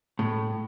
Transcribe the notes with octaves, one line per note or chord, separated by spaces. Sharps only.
A2